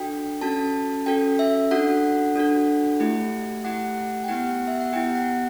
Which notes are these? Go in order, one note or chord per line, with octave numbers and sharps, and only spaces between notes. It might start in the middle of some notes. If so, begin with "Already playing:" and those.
Already playing: D4 F#4 A4 G5
C#4 F#4 A4 A5
C#4 F#4 A4 G5
E5
D4 F#4 A4 F#5
D4 F#4 A4
A3 E4 G4
A3 E4 G4 F#5
G5
B3 E4 G4 F#5
E5
F#5
B3 E4 G4 G5
F#5